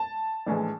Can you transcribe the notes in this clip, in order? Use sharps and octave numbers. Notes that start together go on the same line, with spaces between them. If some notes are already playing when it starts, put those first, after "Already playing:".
Already playing: A5
A#1 A2 E3 G#3